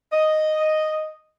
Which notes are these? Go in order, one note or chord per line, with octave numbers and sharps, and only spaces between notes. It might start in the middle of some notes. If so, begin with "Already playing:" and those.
D#5